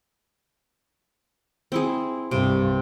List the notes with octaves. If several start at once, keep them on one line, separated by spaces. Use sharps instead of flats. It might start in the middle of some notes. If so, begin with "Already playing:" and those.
C4 E4 G#4
C2 G2 C3